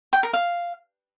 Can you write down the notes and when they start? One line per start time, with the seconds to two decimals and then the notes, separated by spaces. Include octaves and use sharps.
0.13 G5
0.23 A#4
0.33 F5